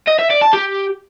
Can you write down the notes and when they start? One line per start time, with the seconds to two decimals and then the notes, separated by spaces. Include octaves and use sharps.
0.07 D#5
0.19 E5
0.30 D5
0.42 A5
0.53 G4